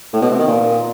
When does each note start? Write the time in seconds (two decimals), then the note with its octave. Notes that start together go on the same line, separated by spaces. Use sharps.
0.13 A2
0.22 B2
0.30 C3
0.39 D#3
0.48 A#2